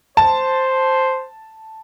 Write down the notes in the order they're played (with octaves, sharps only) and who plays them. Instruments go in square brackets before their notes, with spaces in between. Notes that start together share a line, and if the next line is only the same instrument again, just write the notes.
[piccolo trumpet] C5 [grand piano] A5